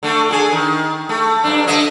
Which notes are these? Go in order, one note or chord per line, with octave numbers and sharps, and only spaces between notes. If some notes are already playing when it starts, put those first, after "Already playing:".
D3 A3
D3 F#4 G#4
D#3
A3
G2 C#3 D4
D3 D#5 E5